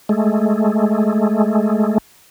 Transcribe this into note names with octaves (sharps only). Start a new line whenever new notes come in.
G#3 A3